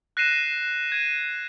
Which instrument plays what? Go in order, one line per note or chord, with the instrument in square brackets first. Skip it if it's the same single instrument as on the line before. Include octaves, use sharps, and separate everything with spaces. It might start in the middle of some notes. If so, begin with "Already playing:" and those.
[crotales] F#6 A#6 C7 D#7 E7
G#6 D#7